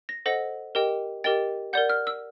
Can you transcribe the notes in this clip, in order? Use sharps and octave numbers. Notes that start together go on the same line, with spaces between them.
A#6
A4 C5 D#5 F#5 A#6
G4 A#4 D#5 G5
G4 A#4 D#5 G5 A6
A#4 D5 F#5 G6
F6
E6